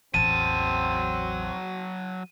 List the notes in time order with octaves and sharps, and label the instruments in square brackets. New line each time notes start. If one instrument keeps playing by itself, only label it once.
[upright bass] A1 E2 [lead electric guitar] F#3 A5 [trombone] C4 [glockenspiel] D#7